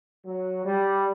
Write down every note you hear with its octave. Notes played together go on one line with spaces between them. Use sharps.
F#3
G3